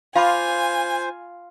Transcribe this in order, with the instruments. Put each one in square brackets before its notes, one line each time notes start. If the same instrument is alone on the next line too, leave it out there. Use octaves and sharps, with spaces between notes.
[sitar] F4 [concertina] C5 [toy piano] F5 B5 D6 [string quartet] G#5